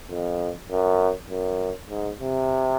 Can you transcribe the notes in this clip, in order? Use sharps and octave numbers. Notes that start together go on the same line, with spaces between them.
F2
F#2
F#2
G#2
C3